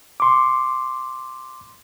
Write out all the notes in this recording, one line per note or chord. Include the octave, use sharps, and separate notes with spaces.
C6 D6